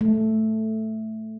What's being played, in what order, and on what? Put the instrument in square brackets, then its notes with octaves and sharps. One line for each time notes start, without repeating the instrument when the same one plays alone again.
[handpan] A3